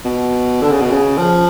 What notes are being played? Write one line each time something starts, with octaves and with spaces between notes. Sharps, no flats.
B2
D3
C#3
B2
C#3
F3